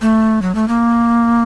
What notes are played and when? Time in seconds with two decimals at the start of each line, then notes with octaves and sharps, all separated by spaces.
0.01 A3
0.42 F#3
0.55 A3
0.68 A#3